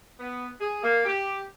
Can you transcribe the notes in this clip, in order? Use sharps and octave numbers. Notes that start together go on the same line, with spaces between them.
B3
G#4
A#3
G4